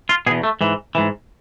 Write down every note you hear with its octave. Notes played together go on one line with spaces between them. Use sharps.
F4
E2 B2 G#4
A3
G#2 E3
G#2 E3